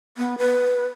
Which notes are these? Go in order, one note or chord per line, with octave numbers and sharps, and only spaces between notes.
B3
B4